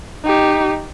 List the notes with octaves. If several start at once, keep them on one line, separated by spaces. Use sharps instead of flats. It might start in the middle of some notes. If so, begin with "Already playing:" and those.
D#4 G4